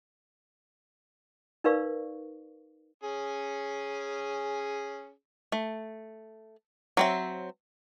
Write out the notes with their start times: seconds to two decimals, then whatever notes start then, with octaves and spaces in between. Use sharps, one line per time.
1.64 D#4 A#4 B4 D5 F5 C#6
3.04 C#4 G#4
5.52 A3
6.97 F#3 C4 E5